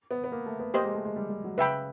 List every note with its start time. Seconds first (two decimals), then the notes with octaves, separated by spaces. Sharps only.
0.11 B3
0.24 B3
0.32 A#3
0.46 A3
0.60 B3
0.74 A#3 G4 C5 D#5
0.84 G#3
0.95 A3
1.05 G#3
1.16 G3
1.30 G3
1.44 F#3
1.58 C#3 B4 E5 G5 B5